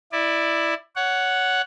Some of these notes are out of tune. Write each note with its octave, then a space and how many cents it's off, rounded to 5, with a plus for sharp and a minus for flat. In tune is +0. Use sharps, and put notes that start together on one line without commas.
E4 +0 D5 +15
C#5 +20 F#5 +0